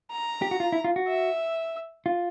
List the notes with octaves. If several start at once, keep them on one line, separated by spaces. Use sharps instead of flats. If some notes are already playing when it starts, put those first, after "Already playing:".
A#5
G4
F#4
F4
E4
F4
F#4
E5
F4